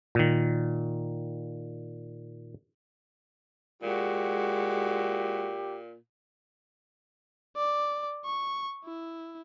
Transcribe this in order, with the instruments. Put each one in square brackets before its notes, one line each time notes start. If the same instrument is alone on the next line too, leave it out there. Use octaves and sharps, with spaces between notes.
[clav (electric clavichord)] A#2 D#3
[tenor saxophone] A#2 [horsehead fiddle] G#3 F#4 [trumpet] G4
[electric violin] D5
C#6
E4